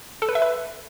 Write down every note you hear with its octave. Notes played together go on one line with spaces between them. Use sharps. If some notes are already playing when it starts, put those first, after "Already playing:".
A4
B4
E5
B4